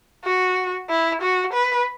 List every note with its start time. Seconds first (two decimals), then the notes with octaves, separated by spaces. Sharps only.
0.25 F#4
0.90 E4
1.22 F#4
1.54 B4